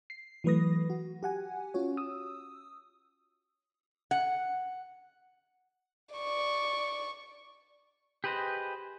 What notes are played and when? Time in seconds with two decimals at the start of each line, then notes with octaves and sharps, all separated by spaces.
0.10 C7
0.44 E3 F#3 A3 B4 D#6 A#6
0.90 F#4
1.23 G4 F#5 G#5
1.74 C#4 F4 F#4 C#5
1.97 D#6 E6
4.11 F#5
6.15 D5 C#6
8.24 G4 G#4 B4 C5 D#5